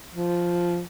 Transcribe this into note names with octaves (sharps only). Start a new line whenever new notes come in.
F3